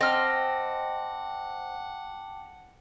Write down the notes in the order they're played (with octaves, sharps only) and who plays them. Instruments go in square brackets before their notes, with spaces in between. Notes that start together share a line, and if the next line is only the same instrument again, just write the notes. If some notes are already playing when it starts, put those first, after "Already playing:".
[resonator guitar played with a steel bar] C4 [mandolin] D#5 F6 [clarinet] F#5 [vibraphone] G5 A5 D6